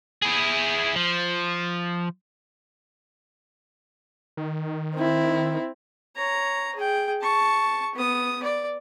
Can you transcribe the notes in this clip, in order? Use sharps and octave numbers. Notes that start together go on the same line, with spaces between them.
E4 G#4
F3
D#3
C4 E4
C#5 A#5
G#4 G5
A5 C#6
B3 D#6
D5